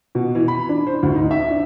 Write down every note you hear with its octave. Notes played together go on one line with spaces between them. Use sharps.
B2
E3
B5
D4
C5
D2
D#4
E5
D4